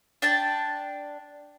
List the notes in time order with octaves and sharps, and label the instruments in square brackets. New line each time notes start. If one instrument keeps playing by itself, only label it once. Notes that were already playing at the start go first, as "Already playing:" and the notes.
[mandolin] D4 G5 A5